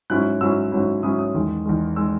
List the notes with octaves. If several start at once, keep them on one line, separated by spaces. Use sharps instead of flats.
G#2 F#3 C#4 E4 F#6
G#2 F#3 C#4 E4 E6
G#2 F#3 C#4 E4
G#2 F#3 C#4 E4 D#6
D#6
E2 D#3 G#3
E2 D#3 G#3
D#3 G#3 E6